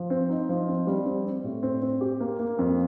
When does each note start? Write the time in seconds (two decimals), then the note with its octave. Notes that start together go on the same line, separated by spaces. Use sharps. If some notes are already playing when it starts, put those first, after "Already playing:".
Already playing: F3
0.10 C4
0.30 D#4
0.49 F3
0.68 C4
0.87 G3
1.05 C4
1.25 C4
1.44 A2
1.63 C4
1.82 C4
2.01 G4
2.20 A#3
2.39 A#3
2.59 F2